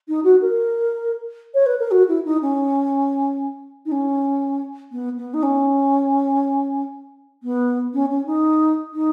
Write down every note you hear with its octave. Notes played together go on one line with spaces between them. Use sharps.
D#4
F#4
A#4
C#5
B4
A#4
F#4
E4
D#4
C#4
D#4
C#4
B3
B3
D#4
C#4
B3
C#4
C#4
D#4
D#4